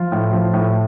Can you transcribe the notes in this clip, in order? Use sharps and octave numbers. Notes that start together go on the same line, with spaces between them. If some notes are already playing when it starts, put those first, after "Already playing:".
Already playing: F3 F4
A2
F3
A2